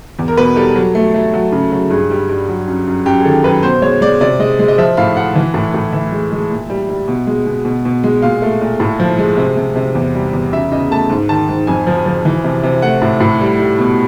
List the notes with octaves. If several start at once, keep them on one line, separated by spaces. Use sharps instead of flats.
E2
A#4
B2 B4
G3 A4
F#3
A3
A3
F#3
C#3
F#3
G2 G#4
G3
G2
F#3
F#2
F#2
F#2 G4
G#4
D#3 A4
F#2 B4
B2 C5
G#3 C#5
G#3 D5
C3 D5
G#3 D#5
G#3
D#5
F3 E5
A2 F5
A2 F#5
E3
A2
A2
E3 E5
G#3
G#3
A#2
G3
G3
B2
G#3
B2
B2
B2
G#3
A#2 F5
A3
A#2
A2
F3
G#3
C3
C3
C3
E2
G3
E2
C#3 E5
C#3 D#5
A3 A5
G#2
D#3 A5
G#2
F2 G#5
F3
F3
E3
C3
C3
A3 F#5
A2
A2
G3
G3
B2